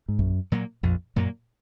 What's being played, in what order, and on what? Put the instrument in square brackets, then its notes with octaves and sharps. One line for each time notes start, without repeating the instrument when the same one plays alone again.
[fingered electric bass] G#2
[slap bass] A#1 [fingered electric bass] F#2
[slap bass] A#2 F#3 A#3
[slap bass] A#1 [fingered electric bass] F2
[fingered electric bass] F#2 [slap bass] A#2 F#3 A#3